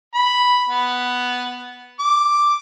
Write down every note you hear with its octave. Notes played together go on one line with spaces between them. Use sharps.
B5
B3
D6